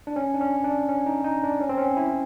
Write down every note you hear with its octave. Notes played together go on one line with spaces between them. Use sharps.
D4
C#4
D4
C#4
D4
C#4
D#4
D#4
D4
C#4
C4
C#4
E4